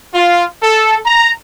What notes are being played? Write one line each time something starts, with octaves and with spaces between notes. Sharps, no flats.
F4
A4
A#5